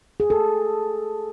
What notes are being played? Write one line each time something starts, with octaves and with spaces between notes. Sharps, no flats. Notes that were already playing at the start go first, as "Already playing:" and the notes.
G#4
A4